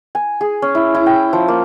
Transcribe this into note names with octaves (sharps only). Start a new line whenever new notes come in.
G#5
G#4
C#4
E4
E4
G5
F3
A#3